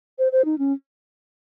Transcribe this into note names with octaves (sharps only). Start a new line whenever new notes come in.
C5
C5
D#4
C#4